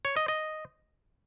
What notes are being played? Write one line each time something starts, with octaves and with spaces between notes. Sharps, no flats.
C#5
D#5
D#5